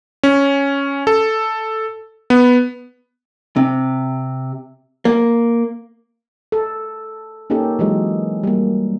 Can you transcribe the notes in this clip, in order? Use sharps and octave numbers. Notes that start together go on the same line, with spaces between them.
C#4
A4
B3
C3
A#3
A4
A#3 C#4 D#4 G4 A4
E3 F#3 G#3
G3 A#3